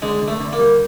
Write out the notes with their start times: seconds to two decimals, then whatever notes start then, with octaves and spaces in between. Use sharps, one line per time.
0.02 D3 G#3
0.22 D3
0.28 A3
0.40 D3
0.53 A#3
0.60 G3